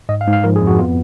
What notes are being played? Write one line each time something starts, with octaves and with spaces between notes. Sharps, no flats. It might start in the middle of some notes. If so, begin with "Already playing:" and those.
G#2 D#5
F5
G#2
F5
F3 A#4
G#4
F2
F#4
B3 F4